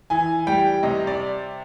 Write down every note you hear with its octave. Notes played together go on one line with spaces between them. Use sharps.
E3 G#5
G3 G5
C3 D#5
D5